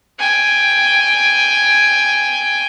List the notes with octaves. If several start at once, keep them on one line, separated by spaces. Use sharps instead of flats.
G5 G#5